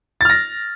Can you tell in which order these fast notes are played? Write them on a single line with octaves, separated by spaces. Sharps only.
A6 F6 A#6